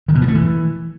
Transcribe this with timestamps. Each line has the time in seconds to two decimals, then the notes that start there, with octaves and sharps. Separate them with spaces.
0.08 D#3
0.15 B2
0.21 F3
0.28 A3
0.34 E3